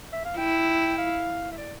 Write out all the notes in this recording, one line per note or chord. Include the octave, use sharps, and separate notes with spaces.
E5
F5
E4 G5
F5
E5
D5